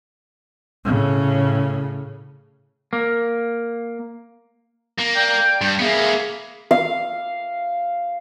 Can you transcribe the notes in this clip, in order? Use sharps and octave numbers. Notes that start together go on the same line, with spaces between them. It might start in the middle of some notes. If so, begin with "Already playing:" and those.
A2 C#3
A#3
A#3
D5 G5 G6
G2
A#3 B3 G#4 E5 F5
F5